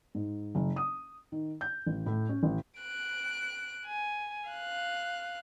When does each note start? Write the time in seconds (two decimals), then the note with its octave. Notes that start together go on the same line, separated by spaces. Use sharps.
0.15 G#2
0.55 F#1
0.76 D#6
1.32 D#3
1.61 G6
1.87 A1
2.06 A2
2.29 C#4
2.43 A1
2.80 F#6 D7
3.86 G#5
4.50 F5 F#6